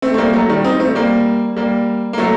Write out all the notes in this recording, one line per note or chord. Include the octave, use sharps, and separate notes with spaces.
A3 C4
A3
G3 A#3
F#3 A3
D#3 G3
C4 D#4
A3 C4
G3 A#3
G3 A#3
A#3
F#3 A3